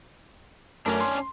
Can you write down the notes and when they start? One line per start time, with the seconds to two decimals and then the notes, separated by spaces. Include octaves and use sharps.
0.86 F#2 A3 C#4 D4 A#4
1.01 C6